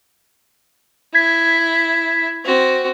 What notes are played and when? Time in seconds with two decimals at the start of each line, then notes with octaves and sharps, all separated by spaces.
1.14 E4 G#6 B6
2.45 C4 F#4